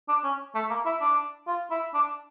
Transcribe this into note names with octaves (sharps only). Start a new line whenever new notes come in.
D4
C#4
A3
A#3
E4
D4
F4
E4
D4